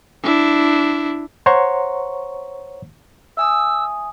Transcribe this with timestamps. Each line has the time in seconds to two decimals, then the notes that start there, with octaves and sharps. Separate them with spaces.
0.23 D4 E4
1.46 C5 C#5 F#5 A#5 C6 C#6
3.37 E5 G#5 D#6 E6